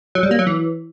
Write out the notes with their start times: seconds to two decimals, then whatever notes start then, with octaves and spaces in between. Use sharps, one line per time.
0.15 F#3
0.23 G3
0.31 A#3
0.39 F#3
0.47 E3